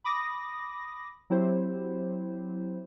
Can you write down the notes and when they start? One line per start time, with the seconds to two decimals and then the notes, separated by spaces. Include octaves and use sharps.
0.04 B5 D6 D#6 A#6
1.30 F#3 C4 E4 G4 C5